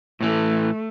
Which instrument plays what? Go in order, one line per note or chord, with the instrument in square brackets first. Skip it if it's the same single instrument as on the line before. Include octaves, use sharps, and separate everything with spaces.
[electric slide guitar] A2 E3 [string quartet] A3